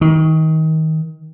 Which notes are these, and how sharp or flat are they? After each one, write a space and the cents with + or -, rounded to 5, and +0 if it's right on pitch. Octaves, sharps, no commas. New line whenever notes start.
D#3 +25